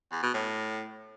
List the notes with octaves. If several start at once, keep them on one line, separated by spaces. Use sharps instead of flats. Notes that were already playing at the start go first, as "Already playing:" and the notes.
E2
B2
A2